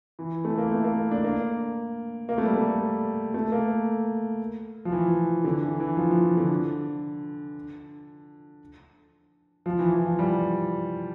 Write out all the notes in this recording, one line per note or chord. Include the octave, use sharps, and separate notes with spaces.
E3
A3
A#3
A3
A#3
D4
A#3
A#3
A3
G3
A3
A3
A#3
F3
E3
D3
E3
E3
F3
F3
D3
F3
E3
E3
F3
G3